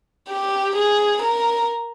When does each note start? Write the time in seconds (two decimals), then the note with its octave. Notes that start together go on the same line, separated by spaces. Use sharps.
0.29 G4
0.76 G#4
1.22 A#4